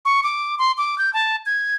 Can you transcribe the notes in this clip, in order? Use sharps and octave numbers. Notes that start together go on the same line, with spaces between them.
C#6
D6
C6
D6
G6
A5
G#6